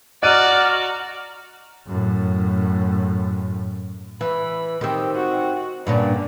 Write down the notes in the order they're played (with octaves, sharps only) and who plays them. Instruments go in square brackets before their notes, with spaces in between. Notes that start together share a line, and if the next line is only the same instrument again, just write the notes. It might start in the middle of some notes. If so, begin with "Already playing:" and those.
[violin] F#4 A#5 [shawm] D5 [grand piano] D#5 F#6 D#7 [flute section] F6
[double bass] F#2 A2
[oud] E3 [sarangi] B5
[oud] D#3 C4 [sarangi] G4
[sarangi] F#4
[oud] G2 A#2 C#4 [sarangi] D3